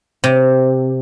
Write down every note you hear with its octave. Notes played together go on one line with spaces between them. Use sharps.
C3